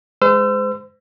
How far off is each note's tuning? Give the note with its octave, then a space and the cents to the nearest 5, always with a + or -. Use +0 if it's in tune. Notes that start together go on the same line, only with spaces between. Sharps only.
G#3 +0 C5 -35 E6 +30